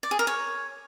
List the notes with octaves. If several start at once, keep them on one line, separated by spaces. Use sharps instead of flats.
D5
G#4
A#4
C#5